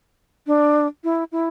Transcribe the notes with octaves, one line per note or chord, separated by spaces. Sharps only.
D4
E4
E4